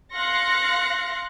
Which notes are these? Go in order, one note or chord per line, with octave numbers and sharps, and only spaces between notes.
F5 C6 F#6 A#6 C#7